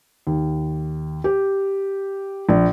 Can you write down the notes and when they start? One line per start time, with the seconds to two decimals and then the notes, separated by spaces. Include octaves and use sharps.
0.27 D#2
1.24 G4
2.49 A#1